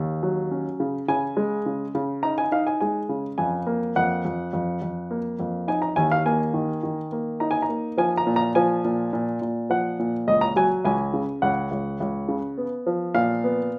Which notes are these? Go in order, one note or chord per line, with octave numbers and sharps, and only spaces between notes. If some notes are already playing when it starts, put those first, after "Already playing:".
Already playing: D#2
F#3
C#4
C#3
C#3 G#5
G#3
C#3
C#3
D#4 A#5
G#5
D#4 F5
G#5
G#3 G#5
C#3
F2 G#5
A#3
F2 F#5
F2
F2
F2
A#3
F2
D#4 G#5
A#5
D#2 G#5
F5
A#3 G#5
D#3
D#3
A#3
D#4 A#5
G#5
A#5
A#3
F3 G#5
A#5
A#2
A#5
F3 G#5
A#2
A#2
A#2
F3 F#5
A#2
C#2 D#5
A#5
F#3 G#5
C#2 G#5
C#3
C#2 F#5
C#2
C#2
C#3
B3
F3
A#2 F5
B3